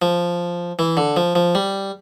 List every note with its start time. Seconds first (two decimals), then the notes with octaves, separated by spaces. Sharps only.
0.02 F3
0.79 E3
0.97 D3
1.17 F3
1.35 F3
1.55 G3